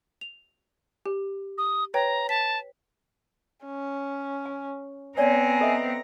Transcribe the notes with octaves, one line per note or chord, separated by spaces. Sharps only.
F7
G4
D#6
B4 C#5 G5 A#5
A5 B6
C#4
G#5
B3 C4 C#5 D5 G#5 A#5
A4 D#5 E5